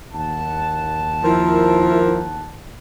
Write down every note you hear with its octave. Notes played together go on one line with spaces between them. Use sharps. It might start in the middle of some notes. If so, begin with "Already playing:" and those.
D#2 F#5 A5
F3 E4 A#4